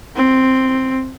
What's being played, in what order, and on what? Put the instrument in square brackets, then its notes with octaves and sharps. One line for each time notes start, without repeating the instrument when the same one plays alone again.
[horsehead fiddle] C4